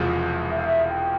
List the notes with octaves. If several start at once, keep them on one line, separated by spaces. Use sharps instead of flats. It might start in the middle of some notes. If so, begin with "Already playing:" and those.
Already playing: E1 E2 C3 F3 G#3
E5
F5
E5
G5